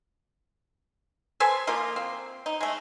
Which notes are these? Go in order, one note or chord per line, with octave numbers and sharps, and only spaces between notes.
A4 B4 C5 G#5
F3 A#3 F4
C4
D#4
G#3 A3